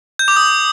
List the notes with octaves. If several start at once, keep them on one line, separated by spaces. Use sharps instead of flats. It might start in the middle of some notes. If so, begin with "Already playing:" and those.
G6
D6
D#6